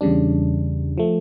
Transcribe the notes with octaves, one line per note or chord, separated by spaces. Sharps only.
E2 C#3 G3 D4
F3 A3